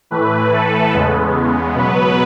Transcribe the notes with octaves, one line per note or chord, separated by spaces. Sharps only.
A2 E3 A3 B4
A4
E2 C#3 G#3 B3
B2 F#3 B3 B4